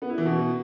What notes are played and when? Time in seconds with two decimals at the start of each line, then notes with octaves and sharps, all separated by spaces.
0.02 B3
0.10 E4
0.18 E3
0.26 B2